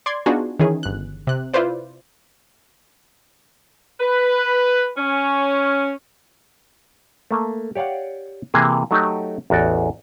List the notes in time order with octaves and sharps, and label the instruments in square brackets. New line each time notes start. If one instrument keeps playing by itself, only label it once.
[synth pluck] D5 C6 G#6
B3 D4 D#4 F4 F#4 G#4
D#3 E3 C#4 G#4
G1 F#6
C3 F#6
E4 F4 B4 C5 D5
[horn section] B4
C#4
[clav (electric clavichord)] A3 A#3
G4 C#5 D5 F5 F#5
C3 E3 A#3 G#4
F#3 A3 D#4 F#4 G4
A1 E2 F#4 D5